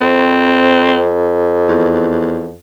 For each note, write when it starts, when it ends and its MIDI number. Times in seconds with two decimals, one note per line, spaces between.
0.01 2.57 41
0.01 1.07 60
1.69 2.53 40